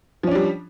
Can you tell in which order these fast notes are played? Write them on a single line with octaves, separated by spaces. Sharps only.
F3 C#4 D4 G3